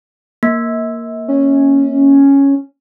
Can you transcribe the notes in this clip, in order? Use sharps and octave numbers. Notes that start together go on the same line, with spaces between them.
A#3
C#4